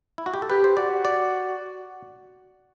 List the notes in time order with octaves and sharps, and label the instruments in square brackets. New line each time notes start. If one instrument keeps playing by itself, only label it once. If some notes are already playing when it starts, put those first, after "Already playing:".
[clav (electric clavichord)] E4
F#4
G4
A4
[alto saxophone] G4 [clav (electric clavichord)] B4
[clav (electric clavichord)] C5
[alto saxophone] F#4 [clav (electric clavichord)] D5
[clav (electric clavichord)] D5